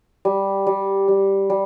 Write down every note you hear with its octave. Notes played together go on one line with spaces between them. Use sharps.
G3
G3
G3
G3